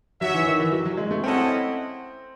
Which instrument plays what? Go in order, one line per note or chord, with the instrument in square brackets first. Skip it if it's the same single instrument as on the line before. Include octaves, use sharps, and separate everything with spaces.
[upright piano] F#3 [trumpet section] F#4 C#5 E5
[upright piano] E3
D#3
E3
F#3
F#3
G#3
A3
[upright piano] C4 [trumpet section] C#4 E4 A4 D#5 F#5